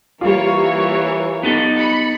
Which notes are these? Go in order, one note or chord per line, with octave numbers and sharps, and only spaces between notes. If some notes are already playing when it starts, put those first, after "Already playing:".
E3 G3 A#3 F4 C#5
B3 D#4 A4
B5 C#7